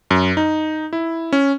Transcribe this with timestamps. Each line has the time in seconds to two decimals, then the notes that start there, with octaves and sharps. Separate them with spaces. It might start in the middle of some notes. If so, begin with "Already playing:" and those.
0.11 F#2
0.37 D#4
0.93 E4
1.33 C#4